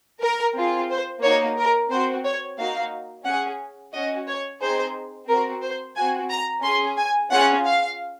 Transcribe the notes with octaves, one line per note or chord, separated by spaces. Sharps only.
A#4
C4 F4 G#4
C5
A#3 D#4 F#4 C#5
A#4
C4 F#4 C5
C#5
A#3 D#4 F#4 F5
C#4 G#4 F#5
C#4 F#4 D#5
C#5
C4 D#4 G#4 C5
C4 F#4 A#4
C5
C4 F#4 G#5
A#5
C#4 G#4 C6
G#5
C#4 F4 G#4 F#5
F5